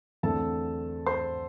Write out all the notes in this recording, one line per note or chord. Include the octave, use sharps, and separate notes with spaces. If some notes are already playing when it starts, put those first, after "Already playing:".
E2 D3 A3 C4 A4 A5
C5 C6